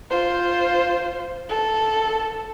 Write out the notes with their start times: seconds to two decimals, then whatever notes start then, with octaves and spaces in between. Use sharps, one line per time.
0.11 F4 C5
1.49 A4